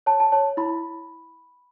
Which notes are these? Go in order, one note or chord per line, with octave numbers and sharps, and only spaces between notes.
C#5 A5
A5
C#5 A5
E4 B5